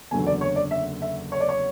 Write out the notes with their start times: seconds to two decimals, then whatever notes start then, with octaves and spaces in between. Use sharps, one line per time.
0.11 F#1 E2 D3 F#3 A3 G#5
0.27 D5
0.41 C#5
0.56 D5
0.71 E5
1.02 E5
1.32 C#5
1.40 D5
1.49 C#5